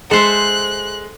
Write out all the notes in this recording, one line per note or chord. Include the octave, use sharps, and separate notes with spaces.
G#3 A4 C5 E5 F#6